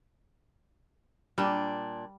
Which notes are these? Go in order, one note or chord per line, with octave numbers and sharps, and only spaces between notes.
A#2 G3 D4